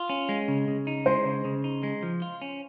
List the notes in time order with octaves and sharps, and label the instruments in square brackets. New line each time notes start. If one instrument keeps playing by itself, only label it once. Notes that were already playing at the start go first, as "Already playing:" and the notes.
Already playing: [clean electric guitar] F4
C#4
G#3
C#3
C#3
D#4
[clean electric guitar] G#3 [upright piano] C5
[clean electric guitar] C#3
C#3
D#4
G#3
F3
F4
C#4